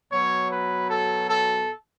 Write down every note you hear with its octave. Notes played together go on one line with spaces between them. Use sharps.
B2 F#3 C#5
B4
A4
A4